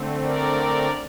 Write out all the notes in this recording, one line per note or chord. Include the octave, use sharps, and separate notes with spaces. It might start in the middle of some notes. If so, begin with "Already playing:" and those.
Already playing: D3 A3 C4
A#4 D5